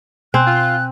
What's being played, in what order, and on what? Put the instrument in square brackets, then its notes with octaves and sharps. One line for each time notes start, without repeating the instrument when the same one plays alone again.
[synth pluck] B2 G#5 C6 [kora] C4 [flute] F#6
[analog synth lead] F4